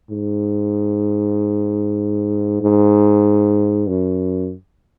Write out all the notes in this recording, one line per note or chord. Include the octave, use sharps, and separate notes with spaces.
G#2
G#2
F#2